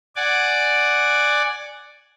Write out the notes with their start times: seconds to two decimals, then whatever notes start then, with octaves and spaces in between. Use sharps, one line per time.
0.16 D5 F#5 G#5 D6